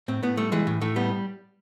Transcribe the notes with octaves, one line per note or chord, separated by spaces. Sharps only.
A2 C4
A2 B3
G3 A3
E3 G#3
A2
A2 A3
G3 B3